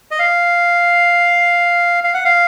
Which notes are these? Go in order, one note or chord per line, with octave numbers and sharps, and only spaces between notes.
D#5
F5
F5
F#5
F5